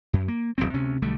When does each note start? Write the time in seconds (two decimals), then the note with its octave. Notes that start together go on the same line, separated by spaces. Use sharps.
0.13 F#2
0.28 A#3
0.58 D1 G#1 F#2 C4
0.74 D2 C3 C#4
1.02 B1 D3 G3 A3